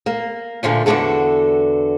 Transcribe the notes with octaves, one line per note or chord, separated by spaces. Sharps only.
A#3
A#2 D3 F3 A3
E2 B2 D3 F#4 A4